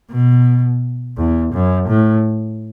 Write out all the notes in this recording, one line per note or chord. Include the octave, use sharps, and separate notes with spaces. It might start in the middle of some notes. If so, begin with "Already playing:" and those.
B2
E2
F#2
A2